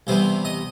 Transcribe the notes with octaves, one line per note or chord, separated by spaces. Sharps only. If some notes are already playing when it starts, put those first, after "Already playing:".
C2 C3 E3 G3 B3 C5
D#5